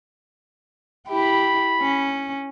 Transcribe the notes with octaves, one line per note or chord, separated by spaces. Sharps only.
E4 G4 B5
C#4